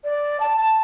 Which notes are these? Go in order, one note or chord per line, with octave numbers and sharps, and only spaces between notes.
D5
A5
A5